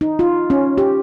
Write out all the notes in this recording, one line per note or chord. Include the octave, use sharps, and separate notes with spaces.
D#4
F4
C#4
G4